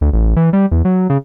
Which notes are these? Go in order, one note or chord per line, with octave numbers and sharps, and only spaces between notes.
D2
A1
E3
G3
E2
F#3
C#3